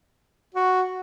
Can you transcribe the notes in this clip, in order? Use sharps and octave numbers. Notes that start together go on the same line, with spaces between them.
F#4